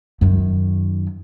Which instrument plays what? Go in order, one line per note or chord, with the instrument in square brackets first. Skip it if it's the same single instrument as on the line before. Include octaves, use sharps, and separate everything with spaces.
[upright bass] F#2 D#3